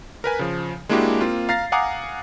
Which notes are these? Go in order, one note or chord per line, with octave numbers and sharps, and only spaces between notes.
A#4 B4 G#5
C#3 F3
G#3 A#3 D4 E4 F#4 G4
A#3 C4 F4
F5 A#5 A6 A#6 C7
F5 F#5 G#5 A#5 D6 D#6